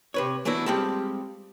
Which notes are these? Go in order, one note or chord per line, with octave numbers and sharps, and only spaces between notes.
C3 B4 C#5
E3 F#3 A3 B3 D4 E4
G3 G#3 C4 F4 G4 A4